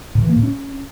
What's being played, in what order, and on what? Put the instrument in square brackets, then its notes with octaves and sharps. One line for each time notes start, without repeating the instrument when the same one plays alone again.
[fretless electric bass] A2
E3
A#3
A2
C#4